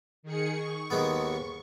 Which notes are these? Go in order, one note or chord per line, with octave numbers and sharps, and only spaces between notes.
D#3 G#4 C#7
C#6
D#2 G#3 B3